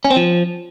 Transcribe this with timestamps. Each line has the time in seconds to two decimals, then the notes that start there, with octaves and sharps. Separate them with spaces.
0.05 C#4
0.10 C4
0.16 F3